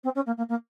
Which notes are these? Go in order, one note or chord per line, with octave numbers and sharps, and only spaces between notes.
C4
C#4
A#3
A#3
A#3